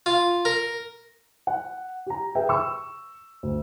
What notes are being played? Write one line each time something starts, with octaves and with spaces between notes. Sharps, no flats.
F4
A#4
F#5
G4 A#5
G#4 B4 E5 G5
C#6 E6
D2